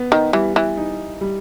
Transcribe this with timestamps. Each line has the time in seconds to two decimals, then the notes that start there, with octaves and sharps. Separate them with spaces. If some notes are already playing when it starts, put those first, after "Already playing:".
Already playing: B3
0.12 D#3
0.33 E3 G3
0.56 E3
0.77 D#4
1.21 G3